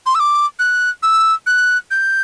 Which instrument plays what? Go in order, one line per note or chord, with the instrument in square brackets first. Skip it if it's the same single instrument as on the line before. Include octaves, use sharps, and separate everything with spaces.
[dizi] C6
E6
D6
F#6
E6
F#6
G6